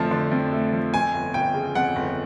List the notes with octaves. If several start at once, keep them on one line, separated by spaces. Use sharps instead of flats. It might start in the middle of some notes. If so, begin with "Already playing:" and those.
Already playing: F2 D3 F3 A3 A5
D3
F2
A3
F3
F2 G#5
G1
G1 G5
C#3
F2 F#5
G1